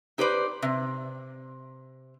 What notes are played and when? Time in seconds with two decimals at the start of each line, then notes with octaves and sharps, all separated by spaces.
0.18 D#4 G4 B4 C5 D5
0.62 C3